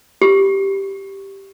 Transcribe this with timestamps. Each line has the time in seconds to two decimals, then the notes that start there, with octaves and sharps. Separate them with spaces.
0.22 G4